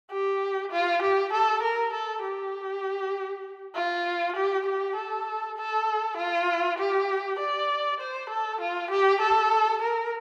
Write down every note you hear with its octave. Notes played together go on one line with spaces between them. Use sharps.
G4
F4
G4
A4
A#4
A4
G4
F4
G4
G4
A4
A4
F4
G4
D5
C5
A4
F4
G4
A4
A#4